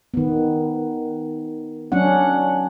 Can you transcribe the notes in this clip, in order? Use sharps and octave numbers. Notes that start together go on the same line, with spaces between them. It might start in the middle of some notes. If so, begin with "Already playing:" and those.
D#3 B3
F#3 C#4 D4 F#5